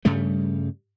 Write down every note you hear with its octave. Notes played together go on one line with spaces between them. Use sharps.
G2 C#3 G3 A3